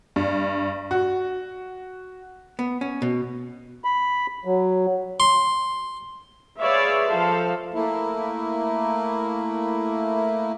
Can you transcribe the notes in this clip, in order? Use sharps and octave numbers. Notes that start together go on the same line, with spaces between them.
G2
F#4
B3
C#4
B2
B5
F#3
C6
G#4 B4 C#5 D5 E5 F5
F3 A4 C5 F5
A3 A#3 E4